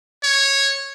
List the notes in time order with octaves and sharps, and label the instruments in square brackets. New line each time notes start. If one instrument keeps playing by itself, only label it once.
[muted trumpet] C#5